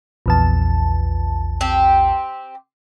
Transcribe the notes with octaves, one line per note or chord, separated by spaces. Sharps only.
A#1 E2 A5
C4 G4